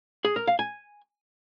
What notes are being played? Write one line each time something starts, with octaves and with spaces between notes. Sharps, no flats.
G#4
A#4
F5
G#5